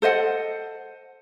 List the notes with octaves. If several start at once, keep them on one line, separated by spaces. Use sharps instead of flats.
A4 C5 D#5 F#5